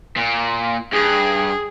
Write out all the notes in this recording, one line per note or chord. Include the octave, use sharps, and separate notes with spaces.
A#2
G2 G#4